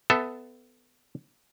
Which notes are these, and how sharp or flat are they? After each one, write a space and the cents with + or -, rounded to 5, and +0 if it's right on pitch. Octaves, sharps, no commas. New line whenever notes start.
B3 +20 A4 +0 E5 +0